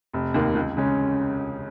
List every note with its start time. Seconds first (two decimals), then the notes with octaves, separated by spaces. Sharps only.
0.13 F1
0.34 D#2 D#3 A#3
0.55 C#2
0.77 C#3 G#3 C#4